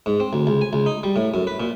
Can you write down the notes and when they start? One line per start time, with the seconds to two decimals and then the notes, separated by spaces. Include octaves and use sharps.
0.06 G#2
0.20 C4
0.33 D2
0.47 C#2
0.61 G#5
0.73 C#2
0.86 D#4
1.03 G3
1.16 A2
1.34 F#2
1.47 B4
1.60 A#2